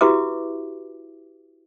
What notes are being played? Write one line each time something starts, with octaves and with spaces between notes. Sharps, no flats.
E4 F#4 G4 B4 E5 D6